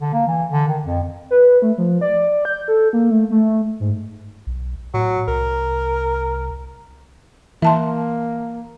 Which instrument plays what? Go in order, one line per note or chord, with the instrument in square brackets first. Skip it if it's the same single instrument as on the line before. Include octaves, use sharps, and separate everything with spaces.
[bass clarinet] D3
A#3
E3
D3
D#3
F2
[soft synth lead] B4
A3
F3
D5
G6
A4
A#3
A3
A3
G#2
[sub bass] B1
[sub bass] A2 [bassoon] F#3
[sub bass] C2 [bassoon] A#4
[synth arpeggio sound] E3 [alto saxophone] A#3 [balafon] E5 A5 C6